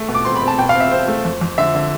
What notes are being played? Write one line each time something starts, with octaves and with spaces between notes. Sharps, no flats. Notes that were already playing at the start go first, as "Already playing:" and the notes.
Already playing: A3
B2
D6
C4 C6
B5
C4
A5
B2 G5
F5
C4
E5
C4 C5
A3
F2
F2
D3 E5
D3